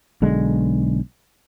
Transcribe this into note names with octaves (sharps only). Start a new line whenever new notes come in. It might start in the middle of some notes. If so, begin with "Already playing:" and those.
B1 D3 G#3